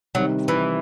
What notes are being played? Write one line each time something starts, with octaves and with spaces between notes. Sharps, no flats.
C3 D#3 F#3 G3
E3